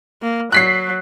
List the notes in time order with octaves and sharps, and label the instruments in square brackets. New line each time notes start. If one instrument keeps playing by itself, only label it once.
[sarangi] A#3
[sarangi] F#3 [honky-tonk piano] F#6 B6 C7